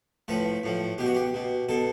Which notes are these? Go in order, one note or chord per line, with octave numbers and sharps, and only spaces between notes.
A2 F3 B4
A2 F3
B2 G4
F#4
G4
B2
B2 A4